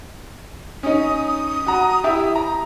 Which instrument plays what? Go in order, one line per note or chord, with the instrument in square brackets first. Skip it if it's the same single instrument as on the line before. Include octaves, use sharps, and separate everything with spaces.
[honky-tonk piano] C#4 D#4 [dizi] D#6
[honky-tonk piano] F#4 A#5
E4 G4 E5
A#5